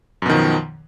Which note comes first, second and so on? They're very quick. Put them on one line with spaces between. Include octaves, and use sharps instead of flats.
F#2 B2 D#3 F3